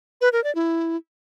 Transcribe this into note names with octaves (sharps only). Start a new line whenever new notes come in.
B4
A#4
D5
E4